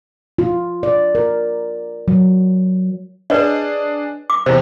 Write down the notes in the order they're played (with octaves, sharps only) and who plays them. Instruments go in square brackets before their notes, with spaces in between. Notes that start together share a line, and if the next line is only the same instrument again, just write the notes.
[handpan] F4
D5
A#4
F#3
[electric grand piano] D4 G#4 [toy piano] B4 C#5 D#5
[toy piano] D6
[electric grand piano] E2 C3 [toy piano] C5